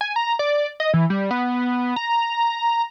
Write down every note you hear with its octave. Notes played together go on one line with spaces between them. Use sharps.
G#5
A#5
D5
D#5
E3
G3
B3
A#5